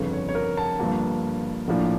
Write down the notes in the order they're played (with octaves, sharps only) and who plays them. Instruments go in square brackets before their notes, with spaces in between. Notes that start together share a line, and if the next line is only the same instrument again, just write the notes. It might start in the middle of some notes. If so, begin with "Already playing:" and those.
Already playing: [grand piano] G1 F2 C#3
C#5
C#5
A#4
A5
G1 G2 F3 A#3
A#1 A2 F3 A#3 D4